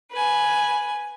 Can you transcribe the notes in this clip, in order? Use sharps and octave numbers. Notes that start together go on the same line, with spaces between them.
B4 G#5